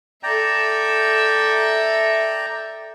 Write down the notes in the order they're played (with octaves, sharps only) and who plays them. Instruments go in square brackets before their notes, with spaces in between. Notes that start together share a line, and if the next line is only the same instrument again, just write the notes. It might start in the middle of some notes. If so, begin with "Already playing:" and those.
[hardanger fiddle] A4 E5 [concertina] D5 G5 A#5